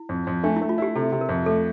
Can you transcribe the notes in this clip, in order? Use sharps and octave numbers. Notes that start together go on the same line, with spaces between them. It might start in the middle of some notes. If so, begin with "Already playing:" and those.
Already playing: E4
F2
F2
A3 D4
E4
A3
F4
E4 G4
C3 A4
C3
A#4
F2
A3 A4